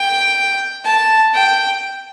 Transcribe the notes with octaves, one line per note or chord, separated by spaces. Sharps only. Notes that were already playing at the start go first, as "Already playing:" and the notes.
Already playing: G5
A5
G5